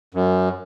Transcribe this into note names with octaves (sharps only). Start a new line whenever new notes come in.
F#2